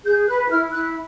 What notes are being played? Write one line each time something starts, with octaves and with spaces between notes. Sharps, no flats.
G#4 G6
B4 F#6
E4 F6
E4 F#6